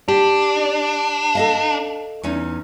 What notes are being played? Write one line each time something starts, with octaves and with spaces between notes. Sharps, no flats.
D4 G4
A4 D#5 F5
E2 C#4 D#4